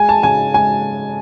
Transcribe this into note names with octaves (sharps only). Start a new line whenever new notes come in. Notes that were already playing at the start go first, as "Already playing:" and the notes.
Already playing: G#3 G#5
A5
C#3 G#5
G#3 G#5